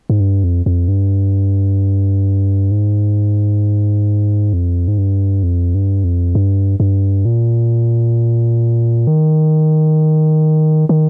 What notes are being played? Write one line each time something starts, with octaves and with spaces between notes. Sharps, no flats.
G#2
G2
F2
F2
G2
G#2
F2
G#2
G2
F2
G2
F2
G2
G2
A#2
D#3
D#3